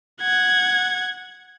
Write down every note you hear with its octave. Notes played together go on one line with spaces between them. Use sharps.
F#5 G#6